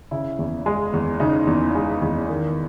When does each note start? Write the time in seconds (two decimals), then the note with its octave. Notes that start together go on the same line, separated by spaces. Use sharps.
0.11 C#3 E4
0.39 E2
0.66 G#3
0.93 E2
1.20 C#3 D#4
1.47 E2
1.75 G#3
2.02 E2
2.29 D#3